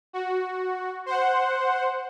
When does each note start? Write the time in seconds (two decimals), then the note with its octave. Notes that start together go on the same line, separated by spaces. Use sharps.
0.13 F#4
1.06 C5 F#5